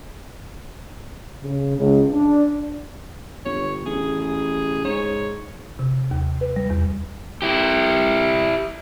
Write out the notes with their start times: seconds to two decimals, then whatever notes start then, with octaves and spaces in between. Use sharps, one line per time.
1.43 C#3
1.78 C#2
2.12 D4
3.45 G1 C#5
3.85 A1 G#4
4.21 G#4
4.84 G#2 C#5
5.79 C3
6.11 D#2
6.41 B4
6.56 G3
6.70 E2
7.42 E4 G4